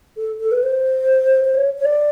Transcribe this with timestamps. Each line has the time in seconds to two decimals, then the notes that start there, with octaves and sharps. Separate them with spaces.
0.17 A4
0.40 A4
0.51 B4
0.63 C5
1.45 C5
1.55 C#5
1.78 C#5
1.84 D5